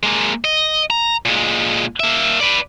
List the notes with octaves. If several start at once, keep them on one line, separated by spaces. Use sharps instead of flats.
G#3 A#3
D#5
A#5
A#2 G#3
A#3 E5
B4 D5